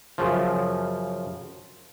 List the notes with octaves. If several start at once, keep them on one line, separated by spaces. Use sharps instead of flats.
F#2 C#3 F3